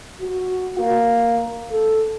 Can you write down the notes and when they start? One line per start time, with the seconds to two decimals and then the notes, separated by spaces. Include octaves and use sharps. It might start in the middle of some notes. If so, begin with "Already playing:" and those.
0.22 F#4
0.79 A#3
1.72 A4